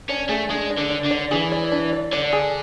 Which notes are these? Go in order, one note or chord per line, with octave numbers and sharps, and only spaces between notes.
C#4 D4
A3 G#4
G#3 D4
D4
D3
D4
D3
D5
E3 G#4
D5
D4
D5
D3 D5
G#4